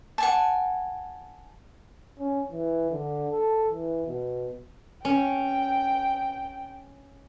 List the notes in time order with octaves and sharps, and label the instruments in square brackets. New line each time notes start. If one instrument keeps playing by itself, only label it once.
[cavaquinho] F#5 G#5 A5
[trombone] C#4
E3
D3
A4
E3
B2
[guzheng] C#4 [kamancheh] G5